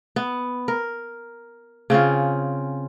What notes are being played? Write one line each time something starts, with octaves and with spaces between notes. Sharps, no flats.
B3
A#4
C#3 C4 C#4 F4